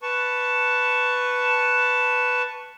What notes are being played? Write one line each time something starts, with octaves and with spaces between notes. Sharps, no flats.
B4 A5 C#6